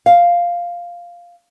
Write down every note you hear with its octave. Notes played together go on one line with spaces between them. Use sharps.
F5